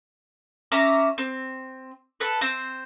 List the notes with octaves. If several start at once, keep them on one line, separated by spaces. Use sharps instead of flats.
C#4 E5 A#5 D6
C4
A4 B4
C4 C5